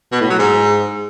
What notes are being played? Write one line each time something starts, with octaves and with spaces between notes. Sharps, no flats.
B2
A2
F#3
G#2